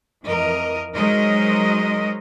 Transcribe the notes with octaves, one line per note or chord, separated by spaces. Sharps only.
F2 E3 A#4 D#5
F#3 G#3 D#4 A#4 C5 D#5